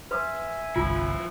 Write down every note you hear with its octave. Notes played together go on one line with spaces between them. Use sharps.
B4 E5 G#5 C6 D#6
G1 C2 F3 E4 F4